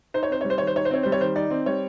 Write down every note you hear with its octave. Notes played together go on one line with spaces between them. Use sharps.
D#4 C5
C#5
C4 C5
C#5
G3
C5
D#3 C#5
C5
D#4 C#5
C5
C4 C#5
G3 C5
C#5
D#3 C5
D#4 D5
C4
G3 C#5